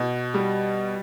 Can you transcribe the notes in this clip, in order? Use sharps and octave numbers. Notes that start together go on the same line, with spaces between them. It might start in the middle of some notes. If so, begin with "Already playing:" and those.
Already playing: B2
G3